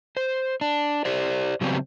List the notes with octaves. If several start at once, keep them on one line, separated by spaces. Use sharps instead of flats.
C5
D4
G4 C5 D5
C#3 F#3 G3 B3 C4